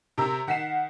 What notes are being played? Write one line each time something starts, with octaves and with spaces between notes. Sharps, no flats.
C3 G4 A#4 E6
D#3 F#5 B6 C7 E7